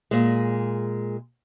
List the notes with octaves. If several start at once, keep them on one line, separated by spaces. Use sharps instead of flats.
A#2 G#3